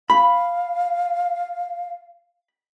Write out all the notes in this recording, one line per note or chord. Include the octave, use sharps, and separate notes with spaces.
F5 B5